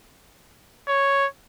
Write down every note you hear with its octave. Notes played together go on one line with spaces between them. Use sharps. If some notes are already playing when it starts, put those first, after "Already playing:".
C#5